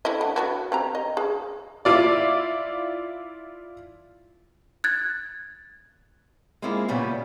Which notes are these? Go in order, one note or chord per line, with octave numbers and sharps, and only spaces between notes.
A3 E4 D#5
D3
F#3 B3 F#4
C4 G4 A#5
D#5
G#4
E4 F4 D5
F#6 G#6 A6
G#3 A#3 C4 E4 F4 G#4
A#2 C#3 G3 B3